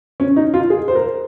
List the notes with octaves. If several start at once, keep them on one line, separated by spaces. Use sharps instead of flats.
C#4
D#4
F4
G#4
C5
A#4